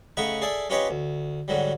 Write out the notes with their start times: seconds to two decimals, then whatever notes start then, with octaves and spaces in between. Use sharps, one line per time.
0.17 C#3 A3 D#4 F#5 B5 C#6
0.42 G#4 A4 D5 E5
0.70 C#4 F4 G4 B4 C#5 D#5
0.89 D2
1.48 G#2 D3 F#3 G3